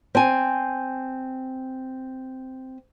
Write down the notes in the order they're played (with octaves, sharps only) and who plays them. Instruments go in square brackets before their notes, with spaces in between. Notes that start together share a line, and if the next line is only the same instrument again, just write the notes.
[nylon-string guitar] C4 G#5